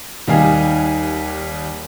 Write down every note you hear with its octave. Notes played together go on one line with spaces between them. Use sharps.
D#2 G3 D#4 F5 G#5